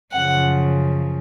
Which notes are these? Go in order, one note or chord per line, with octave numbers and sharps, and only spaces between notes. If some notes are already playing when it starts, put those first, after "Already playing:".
F#2 C#3 F3 F#5